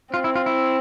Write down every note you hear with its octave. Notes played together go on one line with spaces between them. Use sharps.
C4 F4
E4
F4
E4